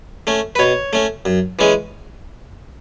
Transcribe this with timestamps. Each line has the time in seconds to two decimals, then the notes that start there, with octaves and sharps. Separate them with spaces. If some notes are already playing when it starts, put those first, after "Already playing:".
0.27 A3 C#4
0.55 B4
0.59 B2 C#5
0.93 A3 C#4
1.25 F#2
1.59 E3 G#3 C#4